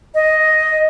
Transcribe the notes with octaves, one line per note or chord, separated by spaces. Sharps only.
D#5